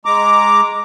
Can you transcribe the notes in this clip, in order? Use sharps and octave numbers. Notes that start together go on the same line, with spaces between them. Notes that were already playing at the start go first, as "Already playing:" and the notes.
G#3 A#5 D6